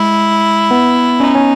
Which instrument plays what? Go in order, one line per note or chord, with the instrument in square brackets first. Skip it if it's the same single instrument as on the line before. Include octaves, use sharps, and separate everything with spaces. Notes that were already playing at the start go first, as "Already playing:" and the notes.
Already playing: [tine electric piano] G#3 [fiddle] E4
[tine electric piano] B3
[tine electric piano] C#4 [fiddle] D#4
[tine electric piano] C#4